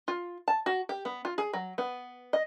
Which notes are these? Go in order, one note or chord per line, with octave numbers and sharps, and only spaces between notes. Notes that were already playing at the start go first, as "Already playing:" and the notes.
F4
A5
F#4
G4
B3
F4
G#4
F#3
B3
D#5